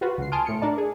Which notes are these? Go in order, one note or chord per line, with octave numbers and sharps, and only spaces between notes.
F4 F#4 B4
C#2 C7
G#5 A5 C6 D#6 F6 D7
A2 C#7
D4 A#4 D5 A5
G#4